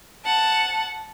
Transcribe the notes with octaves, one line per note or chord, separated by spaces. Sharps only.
F#5 A5